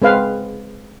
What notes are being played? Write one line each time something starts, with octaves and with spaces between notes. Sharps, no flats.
G#3 C4 B4 F5